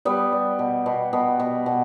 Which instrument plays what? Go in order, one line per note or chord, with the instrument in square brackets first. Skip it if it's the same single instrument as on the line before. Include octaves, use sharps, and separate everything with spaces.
[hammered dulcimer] G3 B3
G3
B2
B2
B2 B3
B2
B2